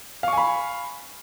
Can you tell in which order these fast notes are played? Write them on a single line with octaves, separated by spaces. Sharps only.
F5 C#6 G#5 B5